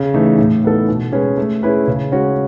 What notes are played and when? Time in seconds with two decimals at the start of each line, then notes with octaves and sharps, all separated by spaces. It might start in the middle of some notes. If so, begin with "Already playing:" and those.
Already playing: C#3
0.14 E3 A3 D#4
0.38 A2
0.64 E3 B3 D#4 A4
0.88 B2
1.13 G#3 C#4 G#4 B4
1.38 A3
1.63 C#4 E4 G#4 B4
1.87 C#3
2.12 G#3 C#4 F#4